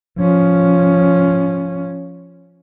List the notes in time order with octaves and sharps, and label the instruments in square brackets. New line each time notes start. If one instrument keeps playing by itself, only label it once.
[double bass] F3 C#4